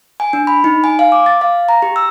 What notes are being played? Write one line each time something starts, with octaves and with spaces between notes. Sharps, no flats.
G#5
D4
B5
D#4
G#5
F5
D6
A6
F5
A#5
G4
E6